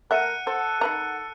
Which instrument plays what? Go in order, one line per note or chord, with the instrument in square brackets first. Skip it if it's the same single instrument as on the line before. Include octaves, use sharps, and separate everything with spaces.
[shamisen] A3 E5 [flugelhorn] A#4 [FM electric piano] F#5 [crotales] F#6 C#7 D#7
[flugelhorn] A4 [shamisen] C5
[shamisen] D#3 B4 A#5 [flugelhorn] A4